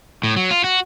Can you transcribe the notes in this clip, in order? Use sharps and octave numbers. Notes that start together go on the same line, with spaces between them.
A2
F#3
F4
F#4